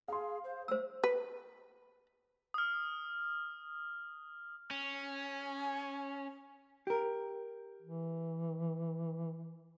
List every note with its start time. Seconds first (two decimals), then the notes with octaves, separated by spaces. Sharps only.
0.08 G#4 F5 C6
0.44 C5
0.68 A3 C5 E6
1.04 B4
2.54 D#6 F6
4.71 C#4 G#5
6.87 G4 A#4
7.82 E3